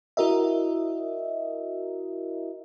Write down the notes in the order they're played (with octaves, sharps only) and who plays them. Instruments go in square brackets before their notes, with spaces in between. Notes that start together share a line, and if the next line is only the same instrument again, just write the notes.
[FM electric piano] E4 F#4 A#4 D#5 E5